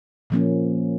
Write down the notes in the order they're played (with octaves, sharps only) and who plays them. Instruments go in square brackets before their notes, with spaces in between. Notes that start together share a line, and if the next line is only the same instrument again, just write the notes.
[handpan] A#2 F3 A#3 C#4